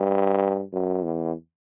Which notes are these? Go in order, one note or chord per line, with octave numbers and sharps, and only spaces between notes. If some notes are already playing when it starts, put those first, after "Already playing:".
Already playing: G2
F#2
E2